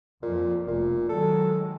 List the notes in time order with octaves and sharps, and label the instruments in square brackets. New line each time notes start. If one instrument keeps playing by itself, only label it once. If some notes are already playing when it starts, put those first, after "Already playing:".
[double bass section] F2 F3 [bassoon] A#2
[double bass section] F1 [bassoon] A#2
[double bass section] D#3 F#3 G#3 [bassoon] A4